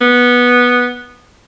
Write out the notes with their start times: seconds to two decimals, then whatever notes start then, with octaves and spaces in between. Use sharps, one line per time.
0.01 B3